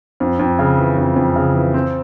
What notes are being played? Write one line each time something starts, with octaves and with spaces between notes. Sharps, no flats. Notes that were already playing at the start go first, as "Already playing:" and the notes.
F2
F2
C#3
E3
F2
F2
C#3
E3
C4